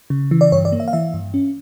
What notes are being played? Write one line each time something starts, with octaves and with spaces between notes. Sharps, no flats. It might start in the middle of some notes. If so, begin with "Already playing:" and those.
C#3
E3
D5
G2 C#5
D5
A#3
E5
F5
E3 E5
G2
C#4